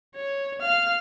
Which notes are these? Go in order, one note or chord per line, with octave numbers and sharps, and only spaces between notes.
C#5
F5 F6